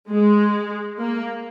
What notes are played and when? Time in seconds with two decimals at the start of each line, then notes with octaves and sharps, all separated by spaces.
0.10 G#3
1.00 A#3